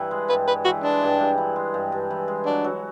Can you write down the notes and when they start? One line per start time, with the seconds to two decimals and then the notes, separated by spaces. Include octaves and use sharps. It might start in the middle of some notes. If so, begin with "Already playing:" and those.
Already playing: G2 E3
0.11 G#3
0.29 G2 B4
0.48 G2 B4
0.65 E3 F#4
0.83 G#3 D4
1.02 G2
1.20 G2
1.38 E3
1.56 G#3
1.74 G2
1.92 G2
2.10 E3
2.28 G#3
2.46 F#3 D4
2.64 F#3